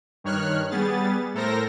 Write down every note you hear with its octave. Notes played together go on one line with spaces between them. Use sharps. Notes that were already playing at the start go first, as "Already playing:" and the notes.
G2 D#3 C#5 F6 F#6
G3 B3 G#4 A6
A2 A4 A#4 C5 A#6